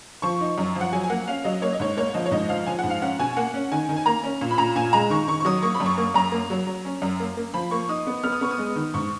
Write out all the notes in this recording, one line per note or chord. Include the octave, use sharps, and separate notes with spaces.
F3 C#6
D#4
F#2
F3
F#5
F#3 G#5
G#5
A#3 F#5
C#4 F5
F#3 D#5
A#3 C#5
D#5
G#2 C#5
A#3 C#5
F3 D#5
C#5
G#2 D#5
F3 F5
F3 G#5
G#2 F#5
F5
C#4 F#5
B2 G#5
A#3 F#5
C#4
D#3 G#5
D#3
G#5
A#3 A#5
C#4
A#2
B5
A#2 A#5
A#2 G#5
G#3 A#5
D#3 C#6
D#3 C#6
C#6
F#3 D#6
A#3 C#6
B5
F#2
C#6
A#3
F#2 A#5
A#3
F#3
F#3
C#4
F#2
A#3
A#3
F3 B5
A#3 C#6
D#4 D#6
B3
B3 F6
D#6
B3 C#6
D#6
G#3
D#3
G#2 C#6